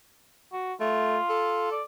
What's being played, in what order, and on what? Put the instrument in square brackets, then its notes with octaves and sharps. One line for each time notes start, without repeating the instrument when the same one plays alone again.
[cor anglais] F#4
[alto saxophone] A3 [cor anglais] F4
[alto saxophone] A4
[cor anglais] D5